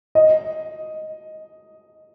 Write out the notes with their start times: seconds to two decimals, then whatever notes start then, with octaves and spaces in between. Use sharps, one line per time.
0.15 D#5